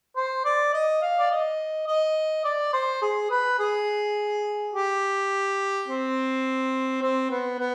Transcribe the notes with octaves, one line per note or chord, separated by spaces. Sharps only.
C5
D5
D#5
F5
D5
D#5
D#5
D5
C5
G#4
B4
G#4
G4
C4
C4
B3
B3